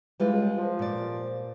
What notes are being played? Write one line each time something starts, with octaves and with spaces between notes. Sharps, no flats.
E3 G3 G#3 F4
C#2
F3
A#2 D5